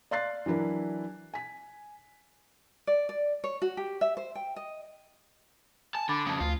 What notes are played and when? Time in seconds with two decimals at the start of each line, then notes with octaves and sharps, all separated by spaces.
0.11 D5 F5 C6 F#6 A6 C7
0.46 E3 F#3 D4 E4 A#4
1.34 G#5 B6
2.87 D5
3.09 D5
3.44 C#5
3.62 F#4
3.77 G4
4.01 E5
4.17 C5
4.35 G5
4.56 D#5
5.95 G#5 A5
6.09 D3 B5 D6 A6
6.26 F2 C#3 A5 D#6
6.40 D2 F4